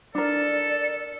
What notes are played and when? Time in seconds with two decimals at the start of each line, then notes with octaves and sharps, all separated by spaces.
0.15 D4 A4 A#4 D5